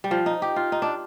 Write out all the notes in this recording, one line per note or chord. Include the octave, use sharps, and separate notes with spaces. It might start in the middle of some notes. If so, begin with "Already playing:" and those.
G3
F3
D#4
G4
F4
D#4
D4